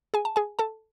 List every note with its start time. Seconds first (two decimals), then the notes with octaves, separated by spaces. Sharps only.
0.14 G#4 G#5
0.25 A5
0.36 G#4 G#5
0.59 A4 A5